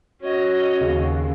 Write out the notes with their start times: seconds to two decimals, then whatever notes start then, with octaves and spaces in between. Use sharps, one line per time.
0.23 C#4 F#4 C#5 D#5
0.81 D#2 C#3